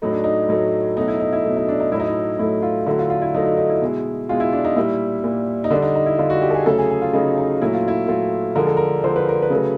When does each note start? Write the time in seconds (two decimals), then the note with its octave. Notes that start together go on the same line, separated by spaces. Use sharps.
0.02 A2 F#3 A3 D#4
0.12 D4
0.24 D#4
0.49 A2 F#3 A3
0.97 B2 F#3 A3 D#4
1.08 E4
1.20 D#4
1.33 E4
1.45 B2 F#3 A3
1.56 D#4
1.68 D4
1.80 D#4
1.92 A2 F#3 A3 E4
2.00 D#4
2.08 E4
2.39 A2 F#3 A3 E4
2.62 F4
2.86 D3 F#3 A3 E4
2.99 F4
3.10 F4
3.22 E4
3.34 D3 F#3 A3 D#4
3.45 D#4
3.57 D#4
3.69 E4
3.81 B2 G#3
4.29 B2 G#3 F4
4.40 E4
4.52 D4
4.65 D#4
4.76 A#2 G3 E4
5.24 A#2 G3
5.64 D#4
5.70 D3 G3 D4
5.82 D#4
5.95 D#4
6.06 E4
6.18 D3 G3 F4
6.30 F#4
6.42 G4
6.50 A4
6.55 G#4
6.66 C#3 F#3 A3 A4
6.78 G#4
6.90 G#4
7.02 F4
7.13 C#3 F#3 A3 D#4
7.38 D#4
7.62 A#2 F#3 A3 E4
7.74 F4
7.88 E4
8.08 A#2 F#3 A3 F4
8.56 D3 F3 G#3 A#4
8.67 A4
8.77 A#4
9.04 D3 F3 G#3 C5
9.16 B4
9.29 A#4
9.42 B4
9.50 C#3 F#3 A3